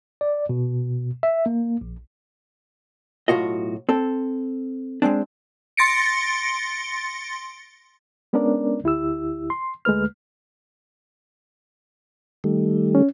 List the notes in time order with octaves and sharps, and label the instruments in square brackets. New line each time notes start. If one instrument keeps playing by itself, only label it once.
[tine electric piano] D5
B2
E5
A#3
A#1
[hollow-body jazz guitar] B1 A2 F4 F#4 D#5
C4 A4
G#3 A3 C4 D4
[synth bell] C6 A6 A#6 C#7 D7
[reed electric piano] G#3 B3 C#4 D4 A#4 D5
D2 E4 G4 E6
C6
D2 G#3 A3 B4 F6
[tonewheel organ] D#3 G3 A3
[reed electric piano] C#4